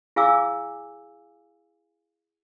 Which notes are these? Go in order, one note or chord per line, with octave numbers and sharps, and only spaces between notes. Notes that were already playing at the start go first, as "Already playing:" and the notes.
E4 G#4 F5 G#5 D6 E6